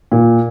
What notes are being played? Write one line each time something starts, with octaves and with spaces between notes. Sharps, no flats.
A#2